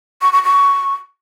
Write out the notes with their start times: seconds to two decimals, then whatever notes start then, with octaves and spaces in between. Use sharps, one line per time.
0.22 C#6
0.33 C#6
0.44 C#6